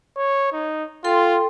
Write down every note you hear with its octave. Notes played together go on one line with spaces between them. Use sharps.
C#5
D#4
F4 A4 G5 C6